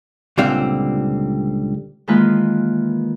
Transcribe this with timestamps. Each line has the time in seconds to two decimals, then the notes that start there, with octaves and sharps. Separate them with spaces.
0.38 C#2 A#2 D3 G3 C4 F5
2.08 D#3 E3 G#3 A#3 F4 B4